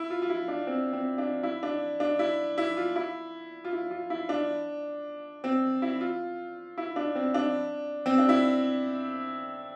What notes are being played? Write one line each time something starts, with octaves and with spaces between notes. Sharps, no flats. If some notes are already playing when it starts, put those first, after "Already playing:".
Already playing: E4
F4
F4
E4
D4
C4
C4
D4
E4
D4
D4
E4
E4
F4
E4
F4
E4
F4
E4
D4
C4
E4
F4
E4
D4
C4
D4
C4
D4
E4